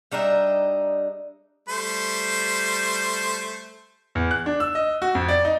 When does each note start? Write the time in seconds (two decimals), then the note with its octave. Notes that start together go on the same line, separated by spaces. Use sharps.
0.11 G3 D4 D#4 E5
1.69 G3 A3 C5
4.15 E2
4.31 F#6
4.46 D4
4.60 E6
4.75 D#5
5.02 F#4
5.15 F2
5.28 D5
5.45 D#4